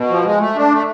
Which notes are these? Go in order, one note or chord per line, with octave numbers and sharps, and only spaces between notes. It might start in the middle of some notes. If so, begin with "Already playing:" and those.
Already playing: B2
F3
G#3
A3
D4
A3